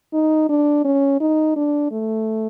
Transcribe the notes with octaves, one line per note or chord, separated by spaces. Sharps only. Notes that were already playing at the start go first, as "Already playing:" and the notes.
D#4
D4
C#4
D#4
D4
A3